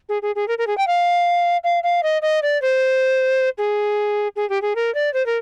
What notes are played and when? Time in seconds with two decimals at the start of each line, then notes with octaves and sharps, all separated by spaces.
0.09 G#4
0.22 G#4
0.36 G#4
0.48 A#4
0.58 A#4
0.67 G#4
0.78 G5
0.87 F5
1.64 F5
1.83 F5
2.03 D#5
2.22 D#5
2.43 D5
2.62 C5
3.58 G#4
4.36 G#4
4.50 G4
4.62 G#4
4.76 A#4
4.95 D5
5.14 C5
5.26 A#4